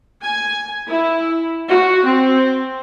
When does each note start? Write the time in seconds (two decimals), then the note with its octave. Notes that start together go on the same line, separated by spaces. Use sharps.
0.23 G#5
0.89 E4
1.70 F#4
2.06 C4